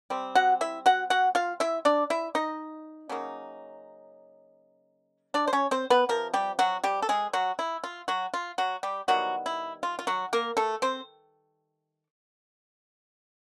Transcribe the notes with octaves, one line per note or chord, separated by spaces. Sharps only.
G3 C4
F#4 F#5
E4 E5
F#4 F#5
F#4 F#5
F4 F5
E4 E5
D4 D5
E4 E5
D#4 D#5
C#3 F#3 A#3 D#4
D4 D5
C5
C#4 C#5
C4 C5
B3 B4
C3 F3 A#4
G3 G4
F#3 F#4
G3 G4
A4
G#3 G#4
F#3 F#4
E4
F4
F#3 F#4
F4
F#3 F#4
G3 G4
D#3 F#3 G3 B3 E4 F#4
E4
F4
F4
F#3 F#4
A#3 A#4
A3 A4
C4 C5